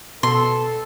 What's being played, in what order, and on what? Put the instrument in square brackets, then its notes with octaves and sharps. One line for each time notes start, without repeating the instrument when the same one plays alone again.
[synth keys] B2 [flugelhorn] A4 [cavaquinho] C6